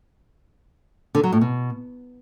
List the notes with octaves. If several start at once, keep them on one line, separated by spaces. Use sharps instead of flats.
D3
F#3
A2
B2